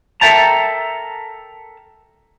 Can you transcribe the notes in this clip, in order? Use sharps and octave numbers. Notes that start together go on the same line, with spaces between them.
A4 A#4 E5 G5 A5 A#5